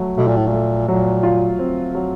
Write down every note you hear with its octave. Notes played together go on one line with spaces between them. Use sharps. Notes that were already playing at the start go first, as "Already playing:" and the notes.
Already playing: F#3 A3
B2 A3
A#2
A2
A#2
A3
A#2 F#3
F4
C4
F#3